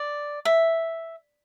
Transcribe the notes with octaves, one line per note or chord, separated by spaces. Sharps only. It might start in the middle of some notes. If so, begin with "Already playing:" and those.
Already playing: D5
E5